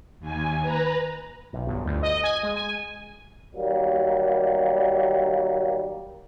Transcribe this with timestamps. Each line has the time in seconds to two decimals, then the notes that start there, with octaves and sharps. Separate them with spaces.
0.20 D#2 G#5
0.62 B4 A#5
1.53 B1
1.67 G1
1.85 D2
2.03 D#5
2.24 G#5
2.43 G#3
2.56 G#5
3.55 D#2 F#3 G3 A#3